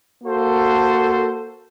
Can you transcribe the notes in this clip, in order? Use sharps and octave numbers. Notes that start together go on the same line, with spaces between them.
A#3 F#4 A4 C5